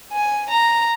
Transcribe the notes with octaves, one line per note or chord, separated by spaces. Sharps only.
G#5
A#5